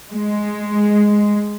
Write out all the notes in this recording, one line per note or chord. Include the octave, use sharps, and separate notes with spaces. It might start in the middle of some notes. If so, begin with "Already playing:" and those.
G#3